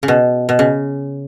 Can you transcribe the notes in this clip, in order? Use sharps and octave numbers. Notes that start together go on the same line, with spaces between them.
C#3
B2
B2
C#3